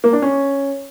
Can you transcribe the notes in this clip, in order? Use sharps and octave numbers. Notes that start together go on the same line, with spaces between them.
A#3
D4
C#4